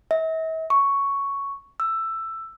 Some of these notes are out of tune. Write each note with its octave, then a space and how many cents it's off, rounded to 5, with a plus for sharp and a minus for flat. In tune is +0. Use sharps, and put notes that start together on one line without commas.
E5 -45
C#6 +5
E6 +10